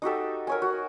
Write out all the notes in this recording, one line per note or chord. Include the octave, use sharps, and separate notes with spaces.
D#4 F#4 G4 A4
A#4 C#5 G#5
F#4